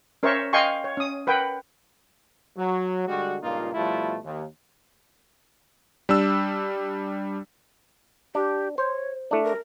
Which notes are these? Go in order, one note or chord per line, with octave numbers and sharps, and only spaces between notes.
C#4 A#4 C5 C#5 E5 C#6
D#5 F5 G5 G#5 C6 C#6
C#5
C#4 D#6
A#4 B4 F#5 G5
F#3
D3 G3 G#3 F#4
C#2 G2 A#2 A#3 D#4 F4
B2 F3 G3 A3 E4 F4
D#2
G3 D4 E6
D4 G4
C5 C#5
A3 D4 E4
A#4